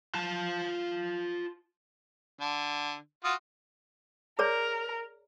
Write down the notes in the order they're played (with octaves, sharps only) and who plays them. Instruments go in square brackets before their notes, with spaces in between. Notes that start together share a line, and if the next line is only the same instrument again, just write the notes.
[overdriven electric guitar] F4 A5
[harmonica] D3
F4 F#4 D#6
[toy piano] G#4 C#5 D5 [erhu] A#4